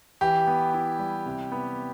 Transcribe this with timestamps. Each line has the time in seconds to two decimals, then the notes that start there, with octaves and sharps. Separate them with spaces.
0.21 E3 G4
0.47 B3
0.74 E4
0.99 G3
1.26 C3
1.52 B3